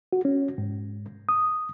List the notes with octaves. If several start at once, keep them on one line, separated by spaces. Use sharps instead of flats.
F#4
C#4
G#2
D#6